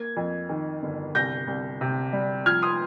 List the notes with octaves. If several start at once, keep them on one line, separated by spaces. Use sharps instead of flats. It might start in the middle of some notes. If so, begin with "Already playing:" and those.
Already playing: A#3 G#6
F2
D#3
G1
C2 G6 A#6
C2
C3
G3
F3 F6 G#6
C6 D#6